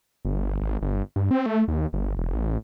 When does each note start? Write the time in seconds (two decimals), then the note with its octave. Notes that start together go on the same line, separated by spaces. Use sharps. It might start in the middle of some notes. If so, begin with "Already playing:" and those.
0.25 G1
0.61 G#1
0.82 G1
1.16 G2
1.31 C4
1.46 A3
1.68 D#2
1.93 G1
2.17 E1
2.33 A1